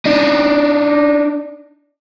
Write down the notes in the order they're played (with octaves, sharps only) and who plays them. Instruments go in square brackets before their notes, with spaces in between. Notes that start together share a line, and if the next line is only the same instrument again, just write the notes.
[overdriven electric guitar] D4 D#4